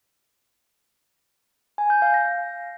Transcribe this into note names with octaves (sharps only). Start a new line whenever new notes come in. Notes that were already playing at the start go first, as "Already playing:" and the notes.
G#5
G6
F5
A#6